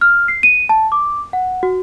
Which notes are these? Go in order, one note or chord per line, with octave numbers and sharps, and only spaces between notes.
F6
C7
D#7
A5
D6
F#5
F#4